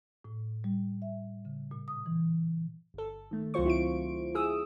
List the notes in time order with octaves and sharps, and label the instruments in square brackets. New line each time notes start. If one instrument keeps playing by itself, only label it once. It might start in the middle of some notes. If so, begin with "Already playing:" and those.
[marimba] A2
G3
E5
C#3
A#2
D#6
E3
[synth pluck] G1 A4
D#3 A3
C#2 F#3 C4 F4 C5 C#6
E4 F4 D7
E4 G#4 D#6 E6